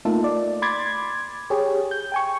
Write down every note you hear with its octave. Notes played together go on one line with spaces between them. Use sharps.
A3 A#3 D#4 F4 A4
D5
B5 C6 D6 G#6 A6
G4 G#4 C#5
G6
G5 G#5 C#6